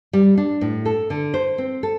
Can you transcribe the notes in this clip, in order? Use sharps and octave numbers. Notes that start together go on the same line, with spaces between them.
G3
D4
A2
A4
D3
C5
C4
A4